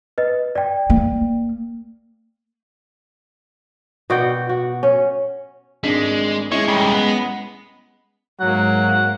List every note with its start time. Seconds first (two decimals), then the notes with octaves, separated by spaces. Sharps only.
0.18 B4 D#5
0.55 D5 G5
0.90 A#3
4.10 B2 F#4 D5 G5
4.49 F#4
4.83 C#4
5.84 G#1 G#3 D4 B6
6.52 G#3 C#4 E4 C#5
6.68 A#2 G3
6.94 B3
8.40 G#2 F#3 A#3 F#5